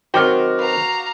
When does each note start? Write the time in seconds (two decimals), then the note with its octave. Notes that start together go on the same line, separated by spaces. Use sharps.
0.14 D#3 F#3 C4 F#4 G5 D6 F6
0.59 B4 F5 A#5